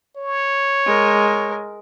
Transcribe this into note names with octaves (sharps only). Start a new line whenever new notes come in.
C#5
G#3 A#4